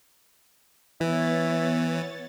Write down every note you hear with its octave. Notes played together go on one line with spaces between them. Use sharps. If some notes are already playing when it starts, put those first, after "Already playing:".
E3 B3 E4 C#5 A6